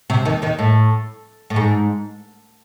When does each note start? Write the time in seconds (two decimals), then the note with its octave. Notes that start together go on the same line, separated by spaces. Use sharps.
0.10 C3
0.25 D#2 D#3
0.42 D#2 D#3
0.59 A2
1.50 A2
1.56 G#2